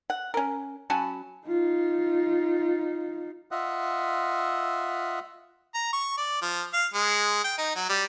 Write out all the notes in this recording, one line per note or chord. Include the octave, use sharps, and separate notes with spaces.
F#5
C#4 A#4
F#3 C#4 A5 B5
D#4 F4
F4 D#5 E5 F#5
A#5
C#6
D5
F3
F5
G#3
G5
D#4
F#3
G3